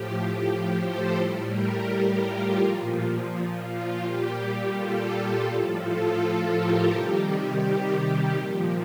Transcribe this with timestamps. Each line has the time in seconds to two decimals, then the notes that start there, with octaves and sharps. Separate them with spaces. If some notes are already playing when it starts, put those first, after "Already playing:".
Already playing: A2 F3 G4
0.80 A4 C5
1.16 A2 G3
1.51 G4 A#4
1.87 G4 A#4
2.23 F4
2.60 A#2 F3
3.67 F4
4.03 A#2 G3 G4
4.74 F4 A4
5.11 G4
5.46 A2 F3
5.82 F4 A4
6.54 G4 A#4
6.90 C3 D#3 G3 G4
7.62 G4
8.34 A#2 F3